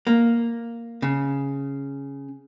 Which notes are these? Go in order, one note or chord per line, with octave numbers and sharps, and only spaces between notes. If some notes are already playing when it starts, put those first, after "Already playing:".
A#3
C#3